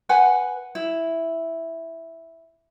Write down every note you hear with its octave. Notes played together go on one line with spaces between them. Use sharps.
B4 F#5 G#5
E4